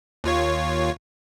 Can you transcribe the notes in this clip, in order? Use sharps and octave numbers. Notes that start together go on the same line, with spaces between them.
D#2 F4 C#5